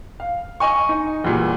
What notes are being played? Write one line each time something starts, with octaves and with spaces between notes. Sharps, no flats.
F5
D#5 G#5 C#6
D#4
E2 A#2 G3